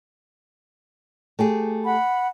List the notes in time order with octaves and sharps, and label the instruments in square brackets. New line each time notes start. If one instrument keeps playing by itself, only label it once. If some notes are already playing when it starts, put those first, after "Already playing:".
[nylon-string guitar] A3 G4 G#4
[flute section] F#5 B5